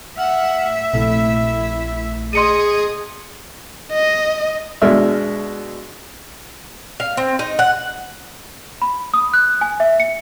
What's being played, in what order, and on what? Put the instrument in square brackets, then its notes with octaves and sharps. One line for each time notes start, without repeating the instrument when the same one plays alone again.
[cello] E5 [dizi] F#5 [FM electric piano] F6
[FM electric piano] A#1 C3 A3 [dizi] E4
[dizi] G#4 [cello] D#5 [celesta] C6 C#7 D#7
[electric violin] D#5
[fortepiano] B2 G#3 D4 E5 F6
[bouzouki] F5
C4
D#4
F#5
[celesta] B5
D#6
F#6
G#5
E5
C#7